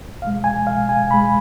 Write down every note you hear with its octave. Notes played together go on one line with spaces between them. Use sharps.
B2 G#3 F5
G#5
B2 G#3 F5
G#5
B2 G#3 B5